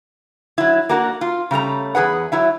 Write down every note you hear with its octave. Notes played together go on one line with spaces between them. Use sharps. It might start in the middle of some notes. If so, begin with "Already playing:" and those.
F#3 E4
A#3 D4 F#4 A#4
F4
C#3 G3 A3 A#5
E2 G#4 B4 F#5
F#3 E4 E5